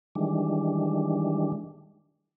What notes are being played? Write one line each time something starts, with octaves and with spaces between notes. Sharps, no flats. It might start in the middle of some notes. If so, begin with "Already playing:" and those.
D#3 E3 G3 G#3 D4